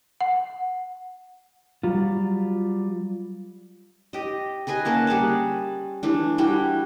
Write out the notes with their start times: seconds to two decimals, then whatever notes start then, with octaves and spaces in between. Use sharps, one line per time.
0.21 F#5
1.83 F#3 G3 F4
4.13 G4 D#5
4.67 G#4 B4 D#5 G#5
4.85 A#3 C#4 F#5 A5
5.07 G3 G#4 F#5 A5
6.03 E3 A3 D4
6.38 G3 E4 F#4 G5